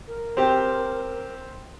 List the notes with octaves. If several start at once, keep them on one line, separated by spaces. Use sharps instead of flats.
A#4
C4 G4